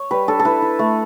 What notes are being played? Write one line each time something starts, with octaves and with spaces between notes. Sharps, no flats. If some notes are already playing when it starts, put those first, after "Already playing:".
Already playing: C#5
G3 B4
D4 A4
A4
E4 B4
E4
A3